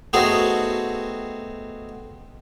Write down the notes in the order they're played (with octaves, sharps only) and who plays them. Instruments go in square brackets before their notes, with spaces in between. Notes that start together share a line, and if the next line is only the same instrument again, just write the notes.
[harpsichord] A3 B3 C4 D#4 F#4 G#4